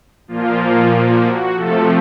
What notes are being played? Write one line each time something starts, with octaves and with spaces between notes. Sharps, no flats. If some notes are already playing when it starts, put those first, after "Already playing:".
A#2 F3 A#3 F4
F4
F#4
C3 F3 A3 A4